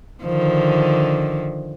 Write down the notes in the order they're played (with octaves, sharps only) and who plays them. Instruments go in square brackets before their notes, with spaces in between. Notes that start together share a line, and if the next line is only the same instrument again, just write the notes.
[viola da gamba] D3 D#3 F3